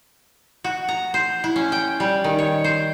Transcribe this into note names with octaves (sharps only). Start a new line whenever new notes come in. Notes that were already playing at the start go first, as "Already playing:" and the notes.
F#4
A#5
C5
E4
C#4
G5
G3
D#3
C#5
C5